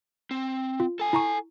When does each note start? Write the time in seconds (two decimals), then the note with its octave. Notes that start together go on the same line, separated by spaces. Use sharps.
0.31 C4
0.80 F4
0.99 A4 G#5
1.13 E4 A#5 C#6